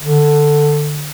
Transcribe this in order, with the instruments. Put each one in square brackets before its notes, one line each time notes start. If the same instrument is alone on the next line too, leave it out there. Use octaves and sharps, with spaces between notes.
[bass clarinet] D3